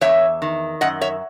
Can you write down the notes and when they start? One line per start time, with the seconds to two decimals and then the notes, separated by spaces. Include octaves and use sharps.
0.01 E2 C#5 E5
0.42 D#3
0.81 F#2 D#5 F#5
1.01 C#5 E5